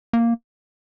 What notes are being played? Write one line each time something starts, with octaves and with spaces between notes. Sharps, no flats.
A#3